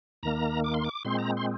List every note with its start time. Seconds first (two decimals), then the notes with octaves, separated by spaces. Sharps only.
0.23 D#2 D#3 A#3 A#5
0.64 D6
0.74 C6
0.84 D6
1.05 A#2 G#3 C4 C6
1.19 A#5
1.37 C6